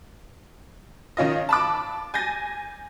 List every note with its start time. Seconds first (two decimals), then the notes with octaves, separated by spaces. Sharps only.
1.17 D#3 C#4 F4 D#5
1.49 A5 B5 D6
2.14 G#5 G6 A6 A#6